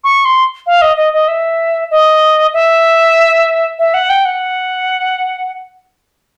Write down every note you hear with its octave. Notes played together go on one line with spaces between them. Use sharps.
C#6
C6
F5
D#5
D#5
D#5
E5
D#5
E5
E5
F#5
G5
F#5